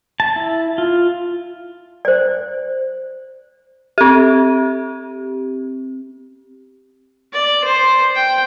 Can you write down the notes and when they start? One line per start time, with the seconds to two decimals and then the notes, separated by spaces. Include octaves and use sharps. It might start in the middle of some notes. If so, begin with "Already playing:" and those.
0.20 A5
0.36 E4
0.78 F4
2.05 C5 D5
3.98 C4 G4
7.33 D5
7.64 C5
8.15 G5